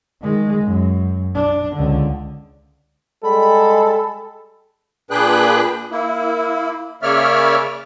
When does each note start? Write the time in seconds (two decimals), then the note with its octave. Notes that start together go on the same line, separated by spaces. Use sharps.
0.23 D#3 G#3
0.64 F#2
1.35 D4
1.76 C#2 D3
3.24 G3 G#3 A4 B5
5.11 A#2 D4 G#4 B4 G5 F#6
5.91 A#3 E4
7.03 C#3 A#3 C#5 D5 E5 F6